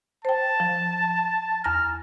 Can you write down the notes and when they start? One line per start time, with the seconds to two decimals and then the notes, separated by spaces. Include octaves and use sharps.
0.25 C5 G5 A5
0.60 F3
1.64 E2 A#5 F6 A#6